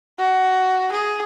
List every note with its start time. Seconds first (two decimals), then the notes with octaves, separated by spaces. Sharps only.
0.19 F#4
0.92 G#4